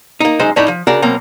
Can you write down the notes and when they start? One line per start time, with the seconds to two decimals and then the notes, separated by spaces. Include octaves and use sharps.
0.20 A#3 D#4
0.39 F#2 G#3 D#4 C5
0.56 F2 A2 D4 D#4 C#5 B5
0.68 F3
0.87 C#3 D4 F#4 A#4
1.02 B2 F#3 A#3 C4